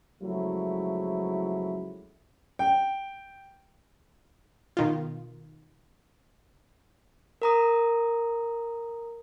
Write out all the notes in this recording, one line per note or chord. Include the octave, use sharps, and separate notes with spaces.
C#2 F3 F#3 G#3 A3 E4
G5
B2 D#3 F4
A#4 A#5 D#6